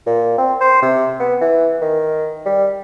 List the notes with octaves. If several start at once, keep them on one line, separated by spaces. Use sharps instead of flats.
A#2
C4
C5
C3
B3
E3
D#3
G3